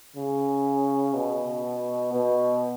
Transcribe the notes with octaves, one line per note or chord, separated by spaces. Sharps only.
C#3
B2
B2